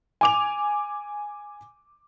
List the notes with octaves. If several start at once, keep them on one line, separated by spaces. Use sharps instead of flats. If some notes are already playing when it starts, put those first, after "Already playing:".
G#5 D6 F7